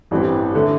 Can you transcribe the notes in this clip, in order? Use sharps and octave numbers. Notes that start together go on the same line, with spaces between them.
A1 G2 E3 G3 C4
D3 A3